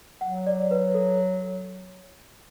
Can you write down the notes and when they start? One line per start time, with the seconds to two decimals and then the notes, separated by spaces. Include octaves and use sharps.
0.21 F#3 F#5
0.47 D5
0.71 B4
0.94 A4